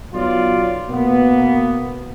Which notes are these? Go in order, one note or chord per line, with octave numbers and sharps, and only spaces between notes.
B1 F#3 F4 D5
B2 A#3 B3